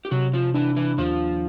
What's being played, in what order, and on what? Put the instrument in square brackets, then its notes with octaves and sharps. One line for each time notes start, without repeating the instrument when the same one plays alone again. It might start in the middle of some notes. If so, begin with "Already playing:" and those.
[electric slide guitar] G4
[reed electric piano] C3 [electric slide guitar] F#3 F#4
[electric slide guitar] F3 F4
[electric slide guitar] E3 E4 [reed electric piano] D4
[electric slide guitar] E3 E4
[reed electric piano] D#2 [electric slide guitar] F3 F4